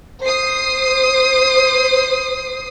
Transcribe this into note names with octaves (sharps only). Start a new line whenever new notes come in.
C5 D#6 C7